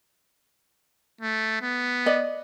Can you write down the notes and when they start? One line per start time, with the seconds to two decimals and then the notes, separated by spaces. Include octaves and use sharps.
1.21 A3
1.62 B3
2.06 D5 D#5